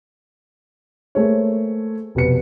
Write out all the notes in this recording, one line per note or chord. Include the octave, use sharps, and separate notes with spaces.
A3 A#3 G#4 A4 C5 C#5
F1 B2 G4 B4 C#7